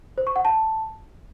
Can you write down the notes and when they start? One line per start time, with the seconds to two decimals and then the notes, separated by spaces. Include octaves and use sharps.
0.18 C5
0.27 C#6
0.36 F#5
0.45 A5